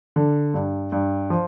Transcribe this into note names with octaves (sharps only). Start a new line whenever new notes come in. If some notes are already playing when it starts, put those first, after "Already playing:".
D3
G2
G2
F3